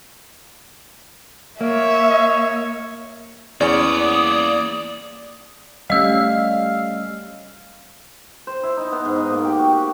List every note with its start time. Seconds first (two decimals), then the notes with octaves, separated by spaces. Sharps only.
1.61 A#3 C#5 E5
3.61 E2 A#3 C#4 D5 F#5 D#6
5.90 G3 A3 C#4 D#5 F5 E6
8.47 C5
8.63 E4
8.77 D#4
8.92 B3
9.05 G#2
9.16 D#4
9.30 A#3
9.45 G4
9.59 F#4
9.73 G4